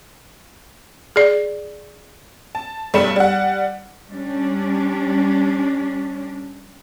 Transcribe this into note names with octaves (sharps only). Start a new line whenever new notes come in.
G#4 D5
A5
B1 G3 A3 B5 C#7 E7
G3 F#5
G3 C#4 D4